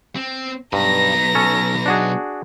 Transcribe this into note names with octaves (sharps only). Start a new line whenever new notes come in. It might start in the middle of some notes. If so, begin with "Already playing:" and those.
C4
B1 G2 B4 A#5 A#6
C#4 A4 C#5
D4 F#4 G#4